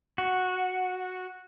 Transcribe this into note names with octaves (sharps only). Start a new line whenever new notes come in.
F#4